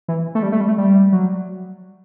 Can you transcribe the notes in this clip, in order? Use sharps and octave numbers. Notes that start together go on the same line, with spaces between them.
E3
A3
G3
A3
G3
A3
G3
F#3